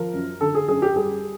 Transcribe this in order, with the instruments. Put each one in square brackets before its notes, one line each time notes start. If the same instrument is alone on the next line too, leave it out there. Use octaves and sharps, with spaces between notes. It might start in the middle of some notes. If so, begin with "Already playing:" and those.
Already playing: [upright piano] F3 A#4
F#2
D3 A4
G#4
F#2 G#4
G4
G3 G#4